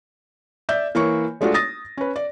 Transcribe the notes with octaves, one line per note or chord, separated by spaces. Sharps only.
D5 E5 G6
E3 A#3 C#5 C#6
G#3 A3 D4 F4 F#4
D#6 A6 A#6
C#4 B4
D5